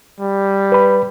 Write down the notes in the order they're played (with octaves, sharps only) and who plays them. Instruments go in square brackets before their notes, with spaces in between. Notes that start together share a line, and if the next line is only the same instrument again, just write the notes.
[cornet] G3
[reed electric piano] B4 B5